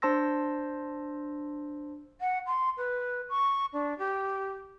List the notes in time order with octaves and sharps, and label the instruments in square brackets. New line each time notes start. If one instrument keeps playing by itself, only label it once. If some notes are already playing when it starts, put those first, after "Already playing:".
[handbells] D4 C5 A5 C6 E6 A#6
[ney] F#5
C6
B4
C#6
D4
G4